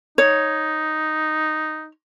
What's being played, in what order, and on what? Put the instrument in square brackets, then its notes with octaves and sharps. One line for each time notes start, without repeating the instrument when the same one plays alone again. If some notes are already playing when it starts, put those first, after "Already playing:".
[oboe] D#4 [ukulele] C#5